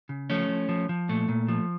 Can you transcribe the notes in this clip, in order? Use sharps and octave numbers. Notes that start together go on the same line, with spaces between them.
C#3
F3 A3 C#4
F3
F3
F3
A#2 A3
A#2
F3